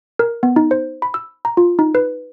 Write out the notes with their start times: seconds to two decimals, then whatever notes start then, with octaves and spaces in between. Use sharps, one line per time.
0.19 A#4
0.43 B3
0.56 D#4
0.71 C5
1.02 B5
1.14 E6
1.45 A#5
1.57 F4
1.79 D#4
1.95 B4